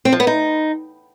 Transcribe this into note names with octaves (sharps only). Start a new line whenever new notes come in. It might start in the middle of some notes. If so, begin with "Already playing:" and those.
C4
F3
B3
D#4